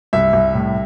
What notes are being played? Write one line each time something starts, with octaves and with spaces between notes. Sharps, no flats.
C2 E5
C2
A2